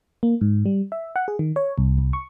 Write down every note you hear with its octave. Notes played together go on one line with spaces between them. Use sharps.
A#3
G#2
G3
E5
F#5
G#4
D#3
C#5
C2
C2
C#6